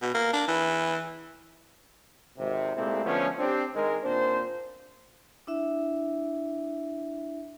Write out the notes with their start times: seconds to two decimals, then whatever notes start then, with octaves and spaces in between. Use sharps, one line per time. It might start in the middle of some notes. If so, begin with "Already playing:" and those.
0.02 B2
0.14 A#3
0.33 D4
0.48 E3
2.38 G#1 C3
2.76 A#2 G#3 A3 C4 E4 G4
3.05 D3 F3 A3 B3 C#4
3.39 C4 D4 G4
3.74 D#3 G#3 A#4
4.03 D#2 A#2 C4 D4 C5
5.47 D4 E4 E5